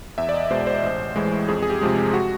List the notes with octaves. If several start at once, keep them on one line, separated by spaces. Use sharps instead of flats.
E2 E5
D5
D#5
B2 G#3 C5
C5
A1
A2 E3 G#3
F2 G#4
G#4
G4
C3 F3 G#3
F#4